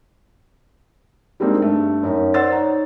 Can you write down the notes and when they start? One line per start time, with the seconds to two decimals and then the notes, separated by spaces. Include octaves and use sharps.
1.40 G3 G#3 A#3 C4 D4 D#4
1.62 G2 A3
2.03 F#2 C#4 D#4
2.34 C5 D5 F#5 C6 E6 A6
2.52 D#4 C#5 A#5